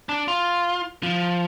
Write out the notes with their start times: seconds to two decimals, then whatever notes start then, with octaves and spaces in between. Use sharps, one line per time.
0.09 D4
0.28 F4
1.03 F3